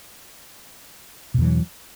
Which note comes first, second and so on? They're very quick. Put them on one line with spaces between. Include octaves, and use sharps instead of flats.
B2 E2 E3 F#3